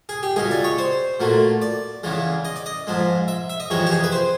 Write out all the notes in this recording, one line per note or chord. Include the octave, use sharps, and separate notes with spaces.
G#4
G4
C#2 B2 G#3 G#4
D5
C#5
C5
A#2 F#3 A3
D5
E2 C#3 E3 G#3
D#5
D5
D#5
G#2 F3 G#3
E5
E5
D#5
F2 C3 E3 G#3 C#5
G4
G#4
B4
C5